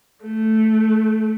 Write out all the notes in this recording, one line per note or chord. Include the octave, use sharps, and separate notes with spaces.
A3